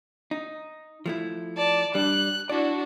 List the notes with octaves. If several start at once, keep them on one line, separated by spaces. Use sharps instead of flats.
D#4
F3 A3 E4
D5 A5
G3 D4 F#6
D4 E4 F#4 D5